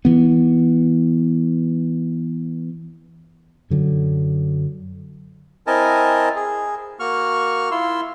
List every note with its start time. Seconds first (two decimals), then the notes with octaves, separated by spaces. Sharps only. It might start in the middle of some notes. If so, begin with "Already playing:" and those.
0.05 E3 B3
3.70 F#2 D3 F#3
5.67 C4 E4 A#4 D#5 G#5 A5
6.36 G#4
7.00 A#3 F#4 C#6 F6
7.71 E4 F4 C6 E6